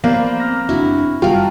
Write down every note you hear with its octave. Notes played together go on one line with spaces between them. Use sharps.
F3 A#3 B3 B4 C5 D5
C4 F6 A#6
F#1 D4 E4 F#4
F#1 G3 F4 F#4 A#4 G5 A5